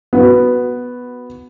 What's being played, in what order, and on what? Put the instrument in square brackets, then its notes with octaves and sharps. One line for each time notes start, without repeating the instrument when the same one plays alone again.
[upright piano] B3 F#4